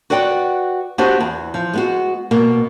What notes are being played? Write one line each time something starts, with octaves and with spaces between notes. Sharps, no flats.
F#4 B4 D5 F#5 G5
B3 D4 F#4 G4 B4 C5
E2
F3
G#3 B3 F#4
B2 A#3 B3